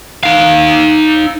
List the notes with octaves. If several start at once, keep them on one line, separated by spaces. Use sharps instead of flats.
D#4 F5